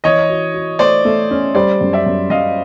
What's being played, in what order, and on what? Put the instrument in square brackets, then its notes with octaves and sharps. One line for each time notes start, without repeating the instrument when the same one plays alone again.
[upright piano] E3 [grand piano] C#5 D#5
[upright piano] F#4
F#4
[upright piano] A3 [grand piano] C5 D5
[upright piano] A3
C#4
[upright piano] G3 [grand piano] C5 D5
[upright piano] F#2
[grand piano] D5 E5
[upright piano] F#2
[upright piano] F#2 [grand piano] D#5 F5